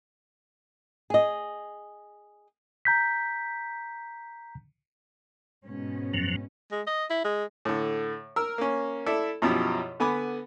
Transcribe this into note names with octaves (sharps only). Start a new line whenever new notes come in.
G#4 D#5
A#5 G6 B6
G#2 B2 C#4
F#2 F3 F#3
G#3
D#5
E4
G#3
A2 D3
A#4 E6
A#3 C#4
E4 A4 D5 E5
F#2 B2 F3 E4 G4
D3 B3 G#5 B5 D6